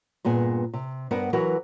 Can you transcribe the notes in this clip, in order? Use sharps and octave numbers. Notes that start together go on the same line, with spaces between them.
G2 A#2 B3 G#4
C3
G2 B3 A#4 C5 F#5
E3 F#3 E4 F#4 A#4 B4